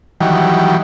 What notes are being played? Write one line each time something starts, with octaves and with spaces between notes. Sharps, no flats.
D#3 E3 F#3 G3